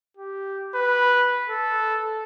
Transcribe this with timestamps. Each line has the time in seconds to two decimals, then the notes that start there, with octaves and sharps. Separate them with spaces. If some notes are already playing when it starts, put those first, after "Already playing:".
0.17 G4
0.75 B4
1.50 A4